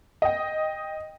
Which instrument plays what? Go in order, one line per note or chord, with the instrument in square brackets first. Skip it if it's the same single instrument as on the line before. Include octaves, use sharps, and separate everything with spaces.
[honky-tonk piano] D#5 G5